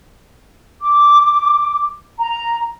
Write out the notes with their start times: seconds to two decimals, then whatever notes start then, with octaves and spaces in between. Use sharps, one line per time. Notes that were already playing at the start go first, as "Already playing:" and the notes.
0.81 D6
2.20 A#5